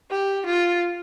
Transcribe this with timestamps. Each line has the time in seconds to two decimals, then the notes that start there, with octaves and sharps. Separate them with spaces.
0.11 G4
0.46 F4